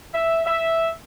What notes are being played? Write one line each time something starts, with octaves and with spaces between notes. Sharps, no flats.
E5
E5